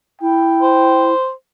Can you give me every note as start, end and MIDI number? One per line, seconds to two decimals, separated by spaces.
0.21 1.14 64
0.21 1.09 79
0.62 1.31 72